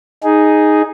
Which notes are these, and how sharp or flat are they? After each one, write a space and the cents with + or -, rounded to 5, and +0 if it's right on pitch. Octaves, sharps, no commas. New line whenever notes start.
D#4 +0 G#4 +0